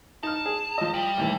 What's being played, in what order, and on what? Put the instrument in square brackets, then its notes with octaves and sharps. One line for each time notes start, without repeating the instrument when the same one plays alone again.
[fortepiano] D#4 F6 [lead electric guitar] A5
[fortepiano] G#4
F3 D#5
[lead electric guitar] G3
[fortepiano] A1 D#2 E3